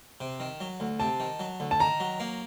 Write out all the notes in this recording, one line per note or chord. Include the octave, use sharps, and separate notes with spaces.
C3
D#3
F#3
D2
C3 A5
D#3
F#3
D2
A5
D#3 A#5
F#3
A#3